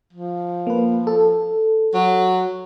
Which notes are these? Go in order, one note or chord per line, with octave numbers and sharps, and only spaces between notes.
F3
A#3 B4
A4
F#3